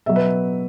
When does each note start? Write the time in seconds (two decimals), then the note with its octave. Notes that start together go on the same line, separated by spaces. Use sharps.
0.06 B2 F#3 E5
0.16 B4